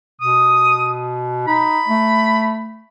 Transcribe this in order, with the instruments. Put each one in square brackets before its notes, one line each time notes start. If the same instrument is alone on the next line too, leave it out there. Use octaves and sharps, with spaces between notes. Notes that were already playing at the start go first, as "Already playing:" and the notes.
[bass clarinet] B2 [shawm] D#6
[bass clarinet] D#4 [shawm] B5
[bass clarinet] A3